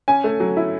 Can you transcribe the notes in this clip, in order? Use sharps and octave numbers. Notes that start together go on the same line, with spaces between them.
C#4 G#5
A3
F#3
E4